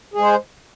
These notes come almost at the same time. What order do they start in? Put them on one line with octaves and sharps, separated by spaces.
G#4 G#3 C5